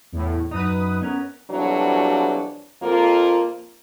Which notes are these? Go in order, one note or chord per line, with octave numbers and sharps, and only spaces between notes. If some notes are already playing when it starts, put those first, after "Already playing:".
E2 A2
F#2 D#4 B4 D#6
B3 C#4 A#4
F2 B2 E3 F#3 G3 D4
F2 A#3 F4